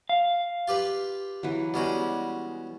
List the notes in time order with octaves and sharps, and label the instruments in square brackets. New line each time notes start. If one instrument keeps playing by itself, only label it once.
[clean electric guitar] F5
[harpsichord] F4 G4 B4
[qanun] E3 F#3
[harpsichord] B2 C#4 F#4 [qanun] G3 G#3 G4